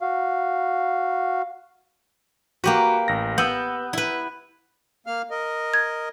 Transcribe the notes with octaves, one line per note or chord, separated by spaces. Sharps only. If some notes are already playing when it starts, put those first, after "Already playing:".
F#4 F5
A#3 F#4 G4 B4
A1 A#6
B3 E6 G6
E4 B4
A#3 F5 F6
A#4 D#5
G#6